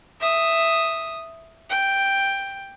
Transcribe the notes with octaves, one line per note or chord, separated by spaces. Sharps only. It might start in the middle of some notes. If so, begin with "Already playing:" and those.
E5 D#6
G5